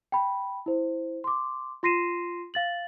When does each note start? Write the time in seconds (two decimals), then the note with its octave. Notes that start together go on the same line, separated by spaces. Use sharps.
0.12 G5 B5
0.66 E4 C5
1.24 C6 D6
1.83 F4 C6 A#6 C7 D#7 E7
2.54 F5 A6 F#7